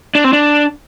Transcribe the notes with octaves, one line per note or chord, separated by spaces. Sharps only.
D4
C4
D4